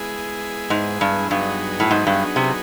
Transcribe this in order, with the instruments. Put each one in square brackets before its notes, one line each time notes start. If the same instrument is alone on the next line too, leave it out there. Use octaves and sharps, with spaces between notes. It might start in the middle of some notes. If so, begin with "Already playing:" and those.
Already playing: [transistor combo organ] G#3 B3 E4 G#4
[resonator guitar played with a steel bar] G#2
G2
[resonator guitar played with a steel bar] G2 [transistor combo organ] F#3 B3 D#4 G#4
[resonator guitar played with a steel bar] A2
G#2
G2
C3